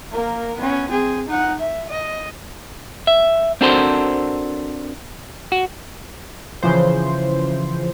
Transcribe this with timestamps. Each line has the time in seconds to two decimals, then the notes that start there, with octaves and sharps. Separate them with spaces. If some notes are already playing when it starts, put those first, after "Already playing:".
0.12 A#3 A#4
0.57 B3 C#4
0.89 C4 G#4
1.28 D#4 F#5
1.60 E5
1.89 D#5
3.07 E5
3.61 C4 D4 F#4 A4 A#4 C5
5.52 F#4
6.63 C#3 E3 F3 C5